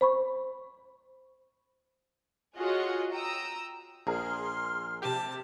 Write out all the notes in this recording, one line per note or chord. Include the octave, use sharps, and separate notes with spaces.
C5 B5 C#6
F4 F#4 G#4 C#5 D#5 F#5
G5 A#5 D#6 E6
A#1 G#4 A#4 C6 F6
C3 G4 A5